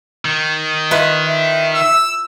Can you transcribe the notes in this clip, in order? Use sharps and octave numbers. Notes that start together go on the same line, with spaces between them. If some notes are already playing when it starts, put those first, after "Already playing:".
D#3
E4 F4 B4 D#5
E5
E6